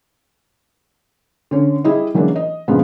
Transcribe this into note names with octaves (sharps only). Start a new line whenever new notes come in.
D3 C#4 D4
G3 E4 G#4 D#5
E3 F#3 G#3 A#3 C#4 D4
D#5
G2 A#2 C#3 F3 G#3 B3